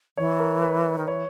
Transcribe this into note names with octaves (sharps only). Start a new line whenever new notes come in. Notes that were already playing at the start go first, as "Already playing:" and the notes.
E3 C#5
A#4
B4
D#3
E3 C#5